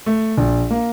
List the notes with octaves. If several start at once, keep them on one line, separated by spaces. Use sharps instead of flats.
A3
A#1
A#3